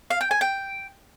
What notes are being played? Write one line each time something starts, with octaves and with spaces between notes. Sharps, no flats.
F5
G5
G#5
G5